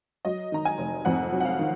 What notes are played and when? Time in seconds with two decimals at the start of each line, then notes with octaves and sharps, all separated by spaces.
0.25 F#3 D#5
0.52 D#3 A#5
0.65 G#5
0.78 F1
1.05 F2 F#5
1.32 F#3
1.40 F#5
1.45 F5
1.59 D#3